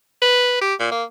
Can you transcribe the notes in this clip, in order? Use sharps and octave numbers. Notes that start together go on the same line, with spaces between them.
B4
G4
A#2
A#3